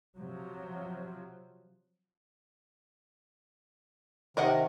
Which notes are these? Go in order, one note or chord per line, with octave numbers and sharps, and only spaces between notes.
C3 F3 F#3
C3 D#3 A#4 D#5 F#5